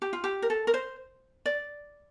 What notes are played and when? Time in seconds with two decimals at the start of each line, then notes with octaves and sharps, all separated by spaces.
0.02 G4
0.13 F4
0.24 G4
0.42 A#4
0.50 A4
0.67 A#4
0.74 C5
1.46 D5